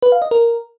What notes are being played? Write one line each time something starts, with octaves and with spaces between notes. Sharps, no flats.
B4
F5
D#5
A#4